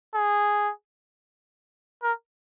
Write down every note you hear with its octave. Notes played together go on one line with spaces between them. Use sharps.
G#4
A#4